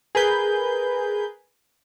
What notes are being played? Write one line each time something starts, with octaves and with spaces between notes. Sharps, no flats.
G#4 A#4 B4 G6